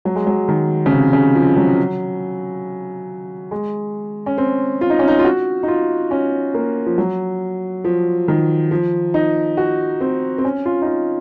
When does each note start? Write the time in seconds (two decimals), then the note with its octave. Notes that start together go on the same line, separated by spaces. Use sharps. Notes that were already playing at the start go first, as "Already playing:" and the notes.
0.05 F#3
0.16 G#3
0.27 F#3
0.48 D#3
0.86 C#3
0.92 C3
1.13 C#3
1.35 F3
1.57 F#3
3.51 G#3
4.26 C#4
4.38 C4
4.81 F4
4.90 D#4
4.99 C#4
5.08 D#4
5.19 F4
5.24 F#4
5.63 D#4
5.68 F4
6.11 C#4
6.54 A#3
6.86 F3
6.98 F#3
7.84 F3
8.28 D#3
8.71 F3
9.14 D#4
9.57 F#4
10.01 C4
10.38 C4
10.45 C#4
10.65 F4
10.82 D#4
10.87 F4